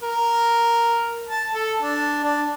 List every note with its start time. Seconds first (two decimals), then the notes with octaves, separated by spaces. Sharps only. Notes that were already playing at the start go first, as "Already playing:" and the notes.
0.02 A#4
1.28 A5
1.54 A4
1.81 D4
2.23 D4